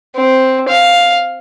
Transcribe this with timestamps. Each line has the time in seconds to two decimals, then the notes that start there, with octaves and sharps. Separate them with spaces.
0.16 C4
0.68 F5